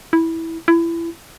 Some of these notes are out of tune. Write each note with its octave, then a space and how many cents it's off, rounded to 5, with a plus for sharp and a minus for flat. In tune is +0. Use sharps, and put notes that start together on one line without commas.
E4 -10
E4 +25